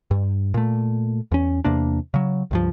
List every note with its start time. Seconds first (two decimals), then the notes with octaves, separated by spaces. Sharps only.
0.11 G2
0.54 A#2 A3
1.32 E2 C#4
1.64 E2 C3 A#3 D4
2.14 C#3 F#3
2.51 C#2 G2 F3